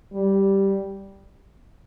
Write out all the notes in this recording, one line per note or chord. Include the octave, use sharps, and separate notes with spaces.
G3